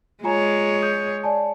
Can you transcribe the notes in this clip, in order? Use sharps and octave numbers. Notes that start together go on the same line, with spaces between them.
G#3 F4 C#5 G#5 A#5
D#6 G6
D5 G#5 A5